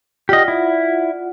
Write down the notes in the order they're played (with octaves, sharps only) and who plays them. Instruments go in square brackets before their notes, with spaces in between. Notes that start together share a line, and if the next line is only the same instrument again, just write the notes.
[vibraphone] F4 D5 F#5 [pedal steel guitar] G4 D#5
[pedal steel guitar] E4